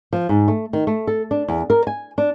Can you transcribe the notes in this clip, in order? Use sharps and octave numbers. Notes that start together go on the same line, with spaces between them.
F3
G#2
A3
D#3
A3
A4
D4
E2
A#4
G#5
D4